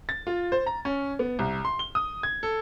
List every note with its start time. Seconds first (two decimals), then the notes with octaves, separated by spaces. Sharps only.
0.09 A6
0.27 F4
0.52 C5
0.66 A#5
0.85 C#4
1.19 B3
1.39 C2
1.65 C6
1.79 G7
1.95 D#6
2.23 G#6
2.43 A4